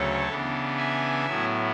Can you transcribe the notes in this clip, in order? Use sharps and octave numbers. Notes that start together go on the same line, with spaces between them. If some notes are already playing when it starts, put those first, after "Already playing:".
Already playing: D2 C#3 F#3 A3 A4 C#5
C#3 E3 B3 D4
E5 G#5
A2 F#3 B3 E4